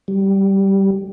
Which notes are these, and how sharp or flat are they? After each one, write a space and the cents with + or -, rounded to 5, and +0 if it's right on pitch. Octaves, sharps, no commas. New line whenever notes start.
G3 -10